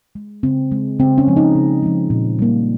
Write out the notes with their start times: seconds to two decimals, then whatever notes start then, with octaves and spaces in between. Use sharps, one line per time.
0.15 G#3
0.43 C#3 C4
0.72 G#3
0.99 C#3 C4
1.18 C#4
1.28 F3 G#3
1.37 D#4
1.55 C#3
1.83 F3 G#3
2.10 A#2
2.39 G3 A#3